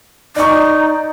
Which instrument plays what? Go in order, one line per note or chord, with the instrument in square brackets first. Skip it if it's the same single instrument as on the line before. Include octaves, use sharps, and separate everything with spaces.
[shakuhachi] D#4 [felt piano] D5 C#6